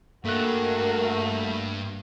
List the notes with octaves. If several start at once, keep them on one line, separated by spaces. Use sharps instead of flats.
G2 A3 A#3 F#4 A#4 F#6